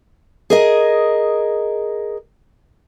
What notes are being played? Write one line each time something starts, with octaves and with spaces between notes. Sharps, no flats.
G#4 A#4 D#5